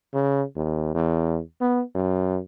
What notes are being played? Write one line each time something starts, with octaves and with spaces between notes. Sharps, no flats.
C#3
D#2
E2
B3
F#2